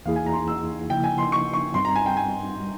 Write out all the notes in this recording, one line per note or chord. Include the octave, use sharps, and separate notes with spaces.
E2 E3 A#3 E4 G#4 F5
G#5
A#5
C6
A#5
E6
C#3 F3 A#3 E4 G5
G#5
C6
C#6
C#6
G2 G3 C4 C6
A#5
G#5
G5
G#5
G3